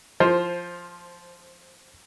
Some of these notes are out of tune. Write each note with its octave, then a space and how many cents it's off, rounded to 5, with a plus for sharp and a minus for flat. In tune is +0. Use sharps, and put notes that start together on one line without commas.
F3 +0 C5 +15